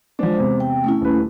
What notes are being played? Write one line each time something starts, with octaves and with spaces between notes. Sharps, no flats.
F3 G#3 D4 C5 D6
E2 C3
G5
A3 C#4 E4
D#1 B4